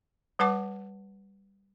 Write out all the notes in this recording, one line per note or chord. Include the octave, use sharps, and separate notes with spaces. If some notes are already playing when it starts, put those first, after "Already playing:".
G3 B4 F#5 A5 D6